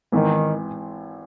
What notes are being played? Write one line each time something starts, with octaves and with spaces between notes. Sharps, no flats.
G#1 G#2 D#3 E3